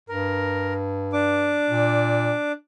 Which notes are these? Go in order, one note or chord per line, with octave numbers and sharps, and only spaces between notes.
G2 A#4
D4 D6
A#2